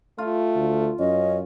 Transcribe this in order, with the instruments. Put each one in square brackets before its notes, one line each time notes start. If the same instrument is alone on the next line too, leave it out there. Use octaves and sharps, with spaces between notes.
[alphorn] A3 [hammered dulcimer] F4
[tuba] D2
[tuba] F#2 [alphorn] C#4 [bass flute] D#5